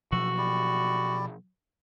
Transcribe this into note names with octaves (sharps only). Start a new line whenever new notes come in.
B2 F3 F#3 F#4 E6
E4 G4 D5